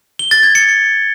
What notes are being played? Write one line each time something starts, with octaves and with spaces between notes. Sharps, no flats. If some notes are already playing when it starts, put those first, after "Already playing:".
G7
A6
G#6
C#7